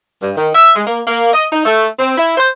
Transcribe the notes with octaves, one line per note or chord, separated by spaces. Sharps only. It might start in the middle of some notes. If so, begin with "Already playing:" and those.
G2
D#3
E5
G#3
A#3
A#3
D#5
D#4
A3
C4
E4
C5